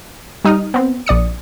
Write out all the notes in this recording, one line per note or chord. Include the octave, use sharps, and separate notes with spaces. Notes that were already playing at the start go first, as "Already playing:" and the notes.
G3 D#4 D#6 F6
B3 C4
A#1 D5 D#6 C#7